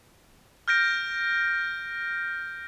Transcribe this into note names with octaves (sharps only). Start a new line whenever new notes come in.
F6 G6 A#6 D7